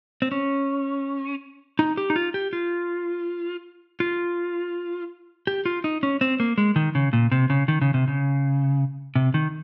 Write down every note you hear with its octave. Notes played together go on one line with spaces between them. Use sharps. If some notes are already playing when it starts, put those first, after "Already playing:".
C4
C#4
D#4
G4
D#4
F4
G4
F4
F4
G4
F4
D#4
C#4
C4
A#3
G#3
D#3
C#3
A#2
C3
C#3
D#3
C#3
C3
C#3
C3
D#3